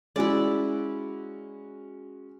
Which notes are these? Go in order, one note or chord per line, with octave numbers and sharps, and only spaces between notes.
G#3 C#4 E4 F#4 D5